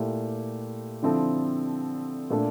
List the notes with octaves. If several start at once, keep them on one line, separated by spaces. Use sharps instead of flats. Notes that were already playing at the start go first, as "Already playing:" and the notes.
Already playing: A#2 A3 E4 G4
D3 F3 C4 E4 A4
A#2 A3 D4 A4